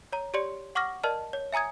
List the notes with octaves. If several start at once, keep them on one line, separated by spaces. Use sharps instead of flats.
C#5 A#5
G4 C#5 D5 C6 C#7
F#5 C#6 D6 F6 A#6
A#4 D5 D#5 A5 F6
C#5
E5 G#5 A#5 D#6 G#6